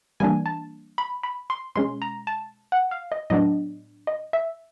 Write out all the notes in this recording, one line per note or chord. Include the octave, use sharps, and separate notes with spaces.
E3 G3 A#3 D4 G#5
A5
B5
B5
C6
B2 G#3 C#4 C6
A#5
A5
F#5
F5
D#5
A2 F#3 B3 D4 D#5
D#5
E5